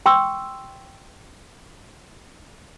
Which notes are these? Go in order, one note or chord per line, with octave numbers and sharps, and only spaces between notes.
G5 C6 C#6 E6